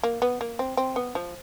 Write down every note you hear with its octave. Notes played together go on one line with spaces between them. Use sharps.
A#3
B3
A#3
C4
C4
B3
F3